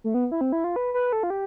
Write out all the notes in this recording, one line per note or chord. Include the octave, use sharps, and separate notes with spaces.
A3
B3
E4
C4
E4
F4
B4
B4
A4
F4
G4